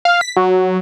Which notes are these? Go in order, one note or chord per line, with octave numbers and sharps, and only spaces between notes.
F5
B6
F#3